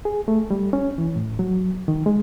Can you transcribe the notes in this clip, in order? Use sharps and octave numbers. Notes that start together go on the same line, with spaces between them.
G#4
A3
G3
C#4
E3
A2
F#3
D#3
G#3